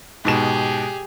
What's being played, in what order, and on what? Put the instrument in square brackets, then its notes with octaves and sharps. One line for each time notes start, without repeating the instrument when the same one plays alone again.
[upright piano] G#2 B2 E7 [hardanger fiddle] G4 G#4